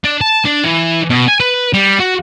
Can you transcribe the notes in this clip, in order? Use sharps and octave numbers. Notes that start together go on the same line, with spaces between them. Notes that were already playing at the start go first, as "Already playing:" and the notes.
D4
A5
D4
E3
B2
G#5
B4
G3
F#4